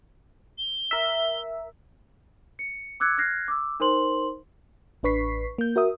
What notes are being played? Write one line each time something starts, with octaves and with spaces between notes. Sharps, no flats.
G7
A#4 E5
C#7
D6 E6 F#6 G#6 C#7
F6 F#6 G#6 A#6 C7
D6 E6
D#4 A#4 C5 C6 F#7
A1 D4 B4 C#6 B6 C7
A#3 G6
F#4 A#4 E5 D#6